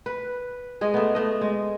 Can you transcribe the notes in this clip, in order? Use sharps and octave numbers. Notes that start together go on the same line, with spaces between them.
B4
G#3 G#4 D#5
A3 B3
A3 D#5
G#3